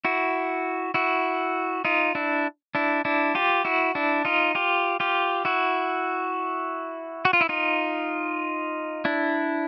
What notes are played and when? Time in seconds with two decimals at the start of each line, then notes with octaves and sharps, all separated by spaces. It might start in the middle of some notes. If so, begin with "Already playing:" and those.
0.05 E4 F#4
0.94 E4 F#4
1.85 D#4 F4
2.15 D4 E4
2.75 D4 E4
3.05 D4 E4
3.35 F4 G4
3.65 E4 F#4
3.95 D4 E4
4.25 D#4 F4
4.55 F4 G4
5.00 F4 G4
5.45 E4 F#4
7.25 F#4
7.33 F4
7.41 E4
7.49 D#4 F4
9.05 D4 E4